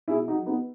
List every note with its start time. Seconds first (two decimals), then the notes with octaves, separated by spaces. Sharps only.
0.08 B2 E4 G#4
0.28 D#4 F#4
0.37 F#3
0.46 B3 D#4